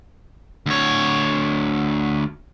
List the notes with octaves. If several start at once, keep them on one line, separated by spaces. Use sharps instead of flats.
D2 C#5